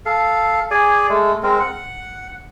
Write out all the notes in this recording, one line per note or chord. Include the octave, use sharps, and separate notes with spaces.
A4 F5
G#4 D5 G#5
G#3 A3
G#3 C4 A#4
F#5